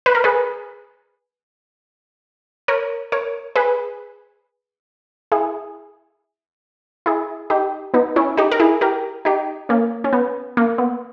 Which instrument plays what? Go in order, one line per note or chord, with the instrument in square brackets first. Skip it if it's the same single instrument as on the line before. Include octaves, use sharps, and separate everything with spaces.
[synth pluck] B4
A#4
G#4 B4
A#4 C#5
A#4 C#5
G#4 B4
E4 G#4
E4 G#4
D#4 G4
B3 D#4
C#4 E4
D#4 G4
A#4
E4 G#4
G4 A#4
D#4 G4
A#3 C#4
C#4
B3
A#3
B3